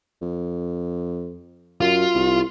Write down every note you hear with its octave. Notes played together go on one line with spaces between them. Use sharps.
F2
F#2 F4
C2